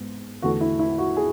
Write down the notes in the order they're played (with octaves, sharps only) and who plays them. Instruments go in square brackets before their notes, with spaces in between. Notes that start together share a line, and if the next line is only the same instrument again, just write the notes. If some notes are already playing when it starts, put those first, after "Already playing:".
Already playing: [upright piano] G#2 G#3 B3
E2 D3 A3 F#4
E4
E4
F#4
G#4